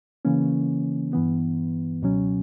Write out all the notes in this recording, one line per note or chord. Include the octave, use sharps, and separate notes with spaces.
C#3 E3 A#3 C#4
G2 E3 B3
C#2 B2 F#3 C#4